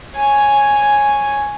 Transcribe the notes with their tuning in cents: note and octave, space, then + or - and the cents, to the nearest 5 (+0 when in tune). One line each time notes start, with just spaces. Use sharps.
C#5 +0 G#5 +0